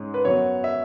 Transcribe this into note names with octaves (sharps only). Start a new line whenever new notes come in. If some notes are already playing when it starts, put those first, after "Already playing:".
Already playing: G#2 G#3 C#4
B4
F#2 F#3 B3 C#5
E5